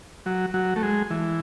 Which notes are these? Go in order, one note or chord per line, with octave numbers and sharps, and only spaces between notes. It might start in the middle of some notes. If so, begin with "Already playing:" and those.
F#3
F#3
A3
G#3
E3